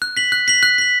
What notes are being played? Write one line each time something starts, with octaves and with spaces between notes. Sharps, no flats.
F#6
B6 F#7
F#6
B6 F#7
F#6
B6 F#7